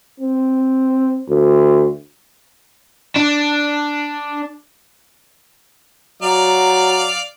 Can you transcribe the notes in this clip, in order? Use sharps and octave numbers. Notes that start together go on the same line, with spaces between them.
C4
D2
D4
F#3 D5 F5 A#5